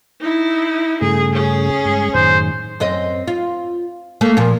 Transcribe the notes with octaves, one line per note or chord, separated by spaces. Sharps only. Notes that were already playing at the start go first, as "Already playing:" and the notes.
D#4 E4
G2 C#3 A3 G#4
C#4 G#4
G2 G#3
F#2 A2 D#3 C5
F#2 C4 D#5
F4
A3 A#3
A#2 F3